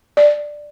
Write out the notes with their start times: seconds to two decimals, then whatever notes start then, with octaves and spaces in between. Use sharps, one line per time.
0.17 D5